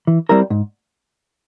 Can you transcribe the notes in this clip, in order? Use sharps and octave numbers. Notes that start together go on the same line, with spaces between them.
E3
G3 C4 E4 A#4
G#2